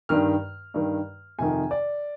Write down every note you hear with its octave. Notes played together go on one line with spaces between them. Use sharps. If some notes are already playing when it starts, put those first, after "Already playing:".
G2 D#3 F6
G2 D#3
F2 C3 D#3 G#5
D5